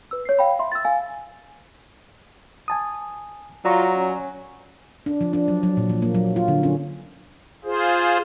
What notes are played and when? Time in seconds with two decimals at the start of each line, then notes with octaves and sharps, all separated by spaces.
0.11 B4 E6
0.25 C#5 C7
0.39 F5 G5 B5
0.59 E5 B5 C6
0.72 E6 A6
0.85 F5 G#5
2.68 G#5 A5 D#6
3.65 F#3 F4 D5 A#5 C#6
3.96 C#4
5.06 D4
5.21 F3
5.33 D4
5.48 F#3
5.63 F#3
5.77 A#2
5.89 F3
6.02 A#3
6.15 F#3
6.36 F4
6.48 D3
6.63 C#4
7.65 F4 G#4 C5